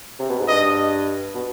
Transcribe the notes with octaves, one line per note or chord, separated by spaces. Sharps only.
C3
B2
G#2
G2 D#5
B2